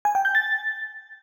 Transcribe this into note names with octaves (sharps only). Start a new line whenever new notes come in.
G#5
G5
G6
A6